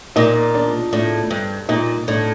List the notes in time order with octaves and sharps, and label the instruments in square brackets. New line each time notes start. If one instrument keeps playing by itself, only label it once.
[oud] A#2 [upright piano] D#4
[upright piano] D4
[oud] A2 [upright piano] D4
[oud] G2
[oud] A#2 [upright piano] D#4
[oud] A2 [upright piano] D4